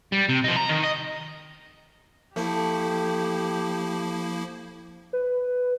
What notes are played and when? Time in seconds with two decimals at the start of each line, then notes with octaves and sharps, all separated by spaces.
0.12 G3
0.29 C3
0.44 F3 D#4
0.56 A#5
0.69 D#3
0.83 D#5
2.36 F3 A3 A#3 E4 G4
5.13 B4